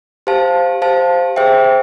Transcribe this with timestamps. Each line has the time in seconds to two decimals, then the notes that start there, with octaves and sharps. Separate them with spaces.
0.27 G4 C5 F5 A5
0.82 G4 C5 F5 A5
1.36 G#4 C5 E5 G5